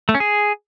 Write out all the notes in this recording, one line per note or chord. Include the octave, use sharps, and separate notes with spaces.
A3
C#4
G#4